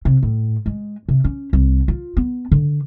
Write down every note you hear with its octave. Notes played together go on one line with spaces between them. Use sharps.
C3
A2
G#3
C3
C#4
C2
F4
B3
D3